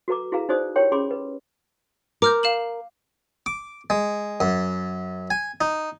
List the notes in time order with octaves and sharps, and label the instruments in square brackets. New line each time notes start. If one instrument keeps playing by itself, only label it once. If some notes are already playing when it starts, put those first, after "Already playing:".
[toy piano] F#4 A4 B4 A#5 D6
E4 F#4 G#4 B4 F5 A#5
D#4 F#4 G#4 C5 D5 D#6
E4 G4 A#4 C#5 G5 C6
C#4 G#4 B5 C6 D6
B4
[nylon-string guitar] A#4 [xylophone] D6 F6 G6
[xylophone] F5 E7 F#7
[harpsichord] D6
G#3
F#2
G#5
D#4